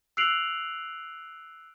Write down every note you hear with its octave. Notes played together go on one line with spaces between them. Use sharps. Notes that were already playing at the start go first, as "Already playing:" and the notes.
E6 F#6 C7 D7 F7 F#7